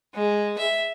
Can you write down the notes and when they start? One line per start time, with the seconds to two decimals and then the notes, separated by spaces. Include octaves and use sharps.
0.14 G#3
0.58 E5